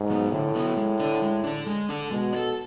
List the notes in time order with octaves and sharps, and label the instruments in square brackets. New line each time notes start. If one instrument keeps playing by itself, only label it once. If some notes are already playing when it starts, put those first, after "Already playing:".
Already playing: [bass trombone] G#2
[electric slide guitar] F#3 B3
[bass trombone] A2 [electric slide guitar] D3
[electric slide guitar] F#3 B3
G#3
D4 A4
G#3
D4 A4
G#3
D4 A4
[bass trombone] B2 [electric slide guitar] G#3
[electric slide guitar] D4
A4